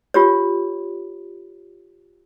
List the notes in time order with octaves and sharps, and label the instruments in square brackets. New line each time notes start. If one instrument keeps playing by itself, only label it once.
[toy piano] F4 G4 C#5